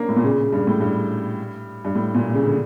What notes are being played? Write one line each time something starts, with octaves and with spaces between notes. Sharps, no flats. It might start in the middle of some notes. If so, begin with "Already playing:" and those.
Already playing: A#3 C#4 D4
A2
A#2
C#3
G2
A2
G2
G2
A2
A#2
C#3
D3